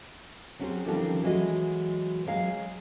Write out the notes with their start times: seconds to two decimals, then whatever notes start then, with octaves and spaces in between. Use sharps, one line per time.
0.59 F#3 C4 C#4 F#4 G#4 C5
0.86 D3 D#3 F3 G3 C4 C#4
1.23 E3 F#3 G#3 A3 F#4 D#5
2.26 F#3 G#3 F5